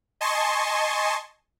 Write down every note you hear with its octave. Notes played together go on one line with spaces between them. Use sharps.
D#5 G#5 A5 C6 C#6